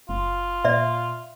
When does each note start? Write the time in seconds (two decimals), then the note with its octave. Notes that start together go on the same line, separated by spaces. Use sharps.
0.09 F#1 F4
0.65 A#2 D5 E5